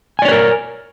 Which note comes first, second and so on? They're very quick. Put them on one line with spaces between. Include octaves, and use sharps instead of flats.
G#5 D5 C#5 B4 A#4